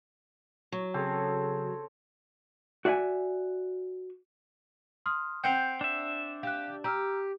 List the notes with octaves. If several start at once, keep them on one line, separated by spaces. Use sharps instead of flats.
F#3
C#3 C4 F#4 G#4 A4 C#5
F#4 D5 E5 F#5 G#5
C6 D#6 F6
C4 F#5 G5 G6 C7 F7
D4 E5
G4 F5 F#6
G4 A#5 E6 F6